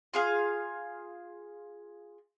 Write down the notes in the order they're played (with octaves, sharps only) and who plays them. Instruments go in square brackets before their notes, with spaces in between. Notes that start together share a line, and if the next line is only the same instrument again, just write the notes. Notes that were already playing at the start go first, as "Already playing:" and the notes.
[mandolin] F4 G#4 F5